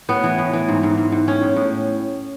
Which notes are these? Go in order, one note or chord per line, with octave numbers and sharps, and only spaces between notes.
A2 B3
E3
A2
E3
G#2
G#2
G#2
G#2
A2 C#4
A2
A2